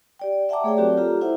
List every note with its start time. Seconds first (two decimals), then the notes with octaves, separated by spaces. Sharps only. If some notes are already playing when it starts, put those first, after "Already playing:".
0.19 G4 D5 G5
0.49 E5 F#5 G5 A5 A#5 D6
0.64 A3 G#4 C#5 D5 G5
0.77 F#3 C4 F#4 G4 A#4 D5
0.97 F4 G4 A4 A#5
1.21 E4 C5 E5 F#5